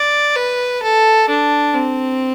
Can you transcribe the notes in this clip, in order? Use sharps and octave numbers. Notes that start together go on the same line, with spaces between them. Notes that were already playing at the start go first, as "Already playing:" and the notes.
Already playing: D5
B4
A4
D4
C4